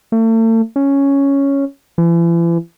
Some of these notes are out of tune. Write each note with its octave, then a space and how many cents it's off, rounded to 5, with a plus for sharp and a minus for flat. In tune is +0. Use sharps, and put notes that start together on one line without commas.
A3 +40
C#4 +0
E3 +40